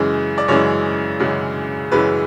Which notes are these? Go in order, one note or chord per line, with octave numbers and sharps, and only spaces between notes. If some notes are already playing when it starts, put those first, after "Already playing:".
Already playing: F#2 C#3 E3 G#3
D5
F#2 C#3 E3 G#3 C#5
F#2 C#3 E3 G#3
F#2 C#3 E3 G#3 B4